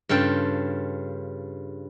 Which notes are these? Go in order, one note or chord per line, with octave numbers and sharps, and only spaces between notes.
G2 C#3 F4 A4 G5